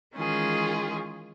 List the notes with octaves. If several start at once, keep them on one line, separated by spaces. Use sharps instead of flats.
D#3 E3 G#3 C#4 F4 G#4